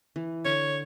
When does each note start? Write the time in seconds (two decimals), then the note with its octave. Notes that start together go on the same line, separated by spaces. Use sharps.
0.16 E3
0.45 D3 C#5